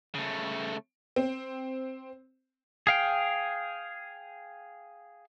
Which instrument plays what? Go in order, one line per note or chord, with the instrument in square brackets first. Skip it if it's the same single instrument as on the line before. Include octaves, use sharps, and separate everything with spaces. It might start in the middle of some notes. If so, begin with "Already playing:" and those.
[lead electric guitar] C#3 A3
[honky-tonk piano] C4
[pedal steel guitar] G#4 F5 G5